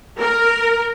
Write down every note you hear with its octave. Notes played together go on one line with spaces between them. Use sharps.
A#4